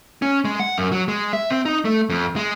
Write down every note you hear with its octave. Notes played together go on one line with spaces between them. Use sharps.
C#4
G#3
F#5
F#2
F#3
G#3
E5
C4
D#4
A3
F2
G#3